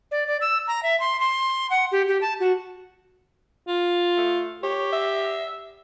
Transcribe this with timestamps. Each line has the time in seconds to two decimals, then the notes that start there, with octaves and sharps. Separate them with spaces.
0.11 D5
0.27 D5
0.41 E6
0.68 A#5
0.83 E5
1.00 C6
1.20 C6
1.70 F#5
1.92 G4
2.08 G4
2.21 A5
2.40 F#4
3.67 F4
4.17 A3
4.63 G4 C#5
4.93 E5